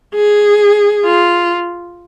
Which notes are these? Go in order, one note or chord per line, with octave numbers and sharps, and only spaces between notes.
G#4
F4